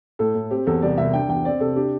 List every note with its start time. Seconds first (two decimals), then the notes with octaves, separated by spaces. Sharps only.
0.19 A2 A4
0.35 A2
0.51 C4 G4
0.66 E2 A4
0.82 C2 D5
0.98 C2 E5
1.13 D4 G5
1.29 E2 G5
1.44 C4 D5
1.60 C3 A4
1.76 D4 G4